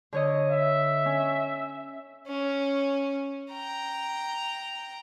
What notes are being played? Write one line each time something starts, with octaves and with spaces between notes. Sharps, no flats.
D3 C#5 D#5
E5
C#4
C#4
G5 A#5